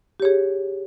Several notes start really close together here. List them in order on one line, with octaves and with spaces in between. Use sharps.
G4 C#5 G#4